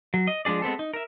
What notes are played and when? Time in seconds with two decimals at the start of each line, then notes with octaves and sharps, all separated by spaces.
0.14 F#3
0.27 D#5
0.45 F3 G#3 D4 G#4 D5
0.62 G#3 B3 C4 A4
0.79 D#4
0.94 A#4 E5